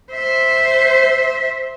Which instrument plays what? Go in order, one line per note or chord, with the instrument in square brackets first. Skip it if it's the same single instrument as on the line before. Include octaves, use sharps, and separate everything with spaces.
[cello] C5 E5